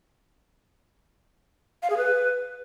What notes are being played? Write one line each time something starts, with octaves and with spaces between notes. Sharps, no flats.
F5
G#4
B4